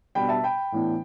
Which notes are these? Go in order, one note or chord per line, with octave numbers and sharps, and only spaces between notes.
B2 G3 B3 D4 G5 B5
E5 A5
G5 B5
A2 E3 B3 D4